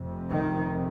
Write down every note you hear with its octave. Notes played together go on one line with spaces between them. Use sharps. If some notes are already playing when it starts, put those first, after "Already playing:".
Already playing: F1 F2 C3
D#3